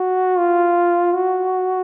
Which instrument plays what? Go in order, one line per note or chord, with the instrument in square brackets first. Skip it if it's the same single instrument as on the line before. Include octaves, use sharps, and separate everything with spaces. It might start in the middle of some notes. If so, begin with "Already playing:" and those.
Already playing: [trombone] F#4
F4
F#4